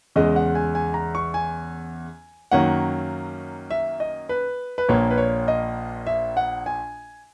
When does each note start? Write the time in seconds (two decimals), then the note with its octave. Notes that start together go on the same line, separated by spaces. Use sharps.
0.16 E2 C#3 G#3 D#5
0.36 F#5
0.55 G#5
0.75 G#5
0.94 A#5
1.15 C#6
1.34 G#5
2.51 F#2 D#3 F#3 A#3 C#4 F#5
3.71 E5
4.00 D#5
4.29 B4
4.78 B4
4.89 A#1 A#2 A#3 C#5
5.10 B4
5.18 C#5
5.48 D#5
6.07 E5
6.37 F#5
6.66 G#5